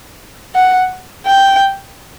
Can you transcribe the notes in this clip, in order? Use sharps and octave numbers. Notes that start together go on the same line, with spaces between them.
F#5
G5